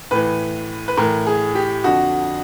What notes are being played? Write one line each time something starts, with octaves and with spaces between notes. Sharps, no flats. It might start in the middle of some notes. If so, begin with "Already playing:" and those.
A2 E3 B4
B4
A2 E3 A#4
G#4
G4
F2 D3 F3 F#4